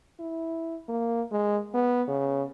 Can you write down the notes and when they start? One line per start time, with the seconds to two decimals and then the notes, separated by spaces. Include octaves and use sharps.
0.19 E4
0.88 A#3
1.31 G#3
1.74 B3
2.08 C#3